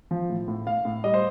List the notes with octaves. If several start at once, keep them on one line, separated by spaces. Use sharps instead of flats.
F3
A2
A2
A2 F5
A2
G3 D#5
C5